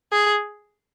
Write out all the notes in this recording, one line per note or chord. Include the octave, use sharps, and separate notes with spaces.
G#4